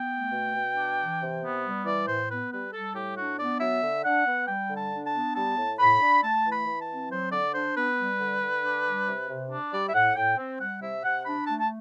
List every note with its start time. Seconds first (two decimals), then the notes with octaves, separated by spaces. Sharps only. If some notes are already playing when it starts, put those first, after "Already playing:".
Already playing: B3 G5
0.12 A3
0.33 B2
0.55 B2
0.77 D4
0.98 E3
1.21 C3
1.43 B3
1.65 G3
1.85 E3 D5
2.08 A2 C5
2.29 B3 B4
2.52 G3 B4
2.73 G3 A4
2.95 A2 G4
3.17 D4 F#4
3.39 B3 D5
3.60 F#3 E5
3.82 D3
4.05 D4 F#5
4.27 B3
4.48 G3 G5
4.70 D3
4.77 A5
4.92 D4
5.07 A5
5.14 B3
5.36 G3 A5
5.57 A2
5.79 A2 B5
6.01 D4
6.23 A3 A5
6.45 E3
6.52 B5
6.67 E3
6.82 A5
6.89 C4
7.10 F#3 C5
7.32 D3 D5
7.54 D4 C5
7.76 B3 B4
7.98 G3
8.19 D3
8.42 D3
8.64 D4
8.85 G3
9.07 C3
9.30 C3
9.51 D4
9.72 G3 D5
9.89 E5
9.94 A2 F#5
10.16 A2 G5
10.38 C4
10.60 G3 F#5
10.82 C3 E5
11.04 C3 F#5
11.26 D4 B5
11.47 A3 A5
11.60 A5